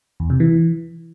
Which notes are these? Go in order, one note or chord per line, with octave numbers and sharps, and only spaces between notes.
E2
C3
E3